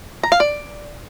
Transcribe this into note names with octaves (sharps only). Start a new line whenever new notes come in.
A#5
F5
D5